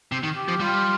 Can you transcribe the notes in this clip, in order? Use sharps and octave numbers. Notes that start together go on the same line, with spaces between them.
C3
D#3
G4
F3
G3 F4